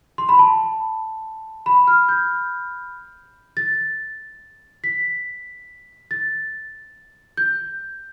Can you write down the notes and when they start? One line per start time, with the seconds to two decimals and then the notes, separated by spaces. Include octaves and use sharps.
0.18 C6
0.29 B5
0.39 A5
1.66 B5
1.87 F6
2.09 G6
3.57 A6
4.84 B6
6.11 A6
7.37 G6